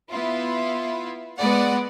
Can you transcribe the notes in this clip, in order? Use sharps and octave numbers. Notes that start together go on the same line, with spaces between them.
B3 E4 F4
G#3 B3 B4 D5 F#5